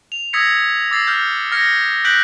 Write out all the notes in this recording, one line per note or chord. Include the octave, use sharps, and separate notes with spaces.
F7
D#6 E6 G#6 A#6 B6 C#7
D6 E6 A6 C7
F6 G6
F6 G#6 A#6 C#7
F#6 G6 B6 D7 F#7